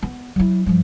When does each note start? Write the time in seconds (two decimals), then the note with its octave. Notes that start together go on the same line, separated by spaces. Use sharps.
0.02 B3
0.36 F#3 E4
0.66 G2 F3